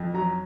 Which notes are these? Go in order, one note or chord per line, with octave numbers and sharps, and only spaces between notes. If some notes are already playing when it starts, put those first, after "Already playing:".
Already playing: F2
F#3 A#5